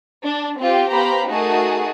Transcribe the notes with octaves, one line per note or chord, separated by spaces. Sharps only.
D4
C4 F4 G4
B3 G4 C5 F5 A#5 B5
A3 D#4 F#4 G#4 A#4 A5